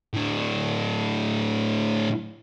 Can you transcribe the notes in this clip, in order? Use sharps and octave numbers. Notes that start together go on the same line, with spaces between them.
A2 D4